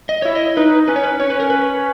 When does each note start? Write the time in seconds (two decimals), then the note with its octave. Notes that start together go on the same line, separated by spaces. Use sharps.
0.09 D#5
0.22 E4 C#5
0.35 D#5
0.57 D#4 B4
0.88 C#4 B4
0.96 C#5
1.04 B4
1.20 C#4 C#5
1.30 B4
1.40 A#4
1.50 B4